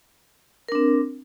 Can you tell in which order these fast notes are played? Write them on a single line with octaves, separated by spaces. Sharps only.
A#4 D4 C4